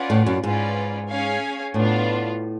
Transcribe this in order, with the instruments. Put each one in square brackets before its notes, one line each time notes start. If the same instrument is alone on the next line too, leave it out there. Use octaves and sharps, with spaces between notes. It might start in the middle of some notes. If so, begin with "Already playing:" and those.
Already playing: [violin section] C#4 F4 B4 D5 F#5
[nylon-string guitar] A2
F#2
[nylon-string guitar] G#2 [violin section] C#4 F4 B4 D5
[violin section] C#4 G#4 C#5 F5 G#5
[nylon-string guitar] A2 [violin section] B3 D4 F4